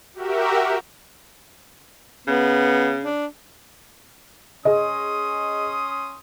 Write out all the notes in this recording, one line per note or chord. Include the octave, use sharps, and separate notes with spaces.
F#4 G4 A#4 E5
C#3 B3
D4
C#4 G#4 D#5 C6 D#6